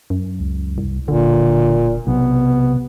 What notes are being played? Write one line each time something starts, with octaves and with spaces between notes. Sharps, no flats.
F#2
C#2
C2
E1 A#2 D3
B1 C3 B3